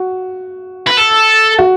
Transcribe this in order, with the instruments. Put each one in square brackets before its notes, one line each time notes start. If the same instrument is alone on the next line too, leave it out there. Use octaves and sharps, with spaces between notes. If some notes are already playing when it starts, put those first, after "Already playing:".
Already playing: [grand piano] F#4
[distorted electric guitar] B4
A4
[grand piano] F#4